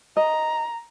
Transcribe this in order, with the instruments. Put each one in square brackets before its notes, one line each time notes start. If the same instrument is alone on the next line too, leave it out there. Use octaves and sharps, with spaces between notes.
[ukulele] D#5 [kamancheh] A#5